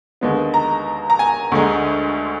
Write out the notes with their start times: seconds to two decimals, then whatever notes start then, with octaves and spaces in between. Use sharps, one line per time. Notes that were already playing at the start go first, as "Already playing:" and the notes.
0.21 D#2 D3 G#3 B3
0.54 A#5
1.10 A#5
1.19 G#5
1.52 D2 D3 G#3